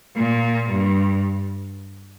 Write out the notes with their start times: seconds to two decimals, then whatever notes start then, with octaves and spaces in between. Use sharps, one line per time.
0.16 A#2
0.70 G2